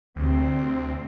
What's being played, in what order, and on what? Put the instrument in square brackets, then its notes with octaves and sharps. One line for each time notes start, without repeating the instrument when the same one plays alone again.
[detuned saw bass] D2 [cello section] C3 C4